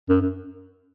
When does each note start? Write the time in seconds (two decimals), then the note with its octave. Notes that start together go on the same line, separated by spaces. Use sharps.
0.09 F#2
0.21 F#2